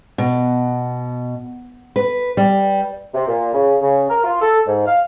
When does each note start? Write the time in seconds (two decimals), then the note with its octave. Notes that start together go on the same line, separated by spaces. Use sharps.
0.18 B2
1.96 B4
2.37 G3
3.14 C3
3.28 A#2
3.53 C#3
3.81 C#3
4.09 A#4
4.24 F4
4.41 A4
4.67 G#2
4.86 F5